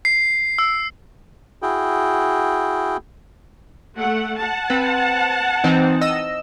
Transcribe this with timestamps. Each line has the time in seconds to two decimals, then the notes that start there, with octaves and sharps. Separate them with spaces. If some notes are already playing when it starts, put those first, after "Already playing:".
0.05 C7
0.58 E6
1.62 E4 F#4 G#4 G5
3.98 A3 F#5
4.40 F#5 A5
4.70 C4 B4
5.64 E3 C4 D#4
6.01 D#5 E6